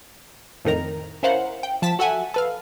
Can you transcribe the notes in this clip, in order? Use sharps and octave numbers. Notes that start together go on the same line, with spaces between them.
F2 A2 D#3 A#4 A#5
C#4 E4 A#4 C5 F5 F#5
G5
F3 A5 A6 B6
F#4 A4 E5 F#5 G#5
A4 B4 F5